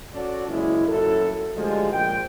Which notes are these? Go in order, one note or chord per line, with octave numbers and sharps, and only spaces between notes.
C#4 F#4 A4 C#5 D5
F#1 G#3 C#4 E4
F#2 A#2 F#3 E4 A4
D2 A2 F3 G3 G#3
A#1 G#2 G#3 G5